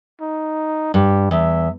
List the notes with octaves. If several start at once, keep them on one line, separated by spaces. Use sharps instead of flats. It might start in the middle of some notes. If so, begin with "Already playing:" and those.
D#4
G2 G4
E2 E5